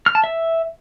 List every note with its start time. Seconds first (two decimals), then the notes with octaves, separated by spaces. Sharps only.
0.06 F6
0.15 A5
0.24 E5